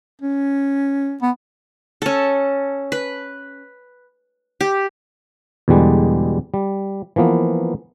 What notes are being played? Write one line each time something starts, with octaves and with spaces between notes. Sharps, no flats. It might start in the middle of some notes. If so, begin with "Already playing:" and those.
C#4
B3
C#4 A4
B4
G4
E2 B2 D3 G3 G#3
G3
E3 F3 A#3 B3